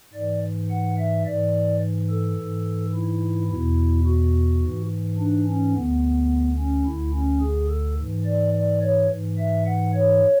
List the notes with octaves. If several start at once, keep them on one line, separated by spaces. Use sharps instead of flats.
G#2 E3 D5
F#5
E5
G#2 E3 D5
A4
G#2 E3
E4
E2 B2 E4
F#4
G#2 E3
D4
C#4
D2 D3 B3
C#4
D2 D3 E4
C#4
G#4
A4
G#2 E3
D5
D5
C#5
G#2 E3
E5
F#5
C#5